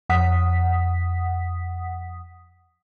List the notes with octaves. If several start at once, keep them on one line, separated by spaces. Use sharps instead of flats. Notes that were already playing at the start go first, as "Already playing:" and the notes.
F2 F#5 D#6 B6